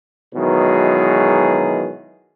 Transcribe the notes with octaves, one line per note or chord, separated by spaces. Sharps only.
B2 D#3 E3 F#3 G#3 G#4